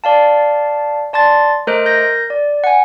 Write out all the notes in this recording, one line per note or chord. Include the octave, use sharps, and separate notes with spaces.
D5 F5 A5
D5 A5 C6 A6
A3 A#4 C5 D#5 F#6 D7
A#4 G6 A#6
D5
F#5 G#5